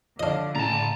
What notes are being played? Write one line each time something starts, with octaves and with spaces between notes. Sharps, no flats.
D3 F3 D4 C#5 D#5 F5
A2 C#3 A5 A#5 A6